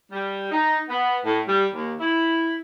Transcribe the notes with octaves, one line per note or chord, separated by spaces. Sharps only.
G3
D#4
B3
A2
G3
D#2
E4